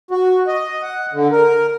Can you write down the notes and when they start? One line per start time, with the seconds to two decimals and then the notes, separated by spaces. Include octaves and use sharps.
0.11 F#4
0.47 D#5
0.82 F#5
1.13 D3
1.32 A#4